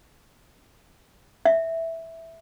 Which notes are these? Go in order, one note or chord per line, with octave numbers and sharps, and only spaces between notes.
E5